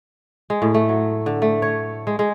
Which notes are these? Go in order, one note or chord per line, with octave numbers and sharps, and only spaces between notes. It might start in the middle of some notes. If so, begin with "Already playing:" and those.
G#3
A2
A3
F#3
D3
A3
C#5
G#3
G#3